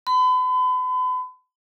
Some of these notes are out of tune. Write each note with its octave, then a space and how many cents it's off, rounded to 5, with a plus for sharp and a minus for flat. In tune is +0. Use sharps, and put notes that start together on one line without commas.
B5 +40